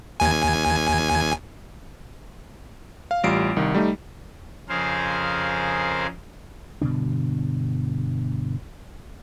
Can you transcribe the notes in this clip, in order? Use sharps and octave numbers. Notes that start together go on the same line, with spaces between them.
D#2 G#5
F5
A1 G3 F4 C7 D7
C2 D#3
G3 A3 D#4
F2 C#3 G#4 A#4 C5 F5
G1 B2 D3 D4